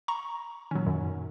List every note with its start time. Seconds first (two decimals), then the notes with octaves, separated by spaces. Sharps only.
0.08 A#5 C#6
0.71 A#2 D#3 F#3 C#4
0.87 F#2